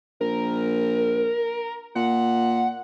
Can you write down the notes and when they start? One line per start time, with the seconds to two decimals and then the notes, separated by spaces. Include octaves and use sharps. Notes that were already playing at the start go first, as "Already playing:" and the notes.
0.21 A#1 A#4
1.95 A#2 F#5